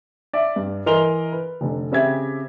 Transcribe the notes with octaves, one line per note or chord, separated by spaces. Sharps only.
D5 E5
G2
E3 A#4 D#5 C6 F7 G7
B4
F1 D3
C#3 C4 G4 E5 G#6